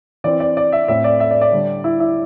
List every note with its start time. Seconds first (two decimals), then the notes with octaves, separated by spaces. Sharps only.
0.24 E3 C4 D5
0.40 D5
0.57 D5
0.72 E5
0.88 A2 A3 C4 E5
1.04 D5
1.20 E5
1.31 D5
1.41 D5
1.52 D3 G3 D4
1.84 E4
2.00 E4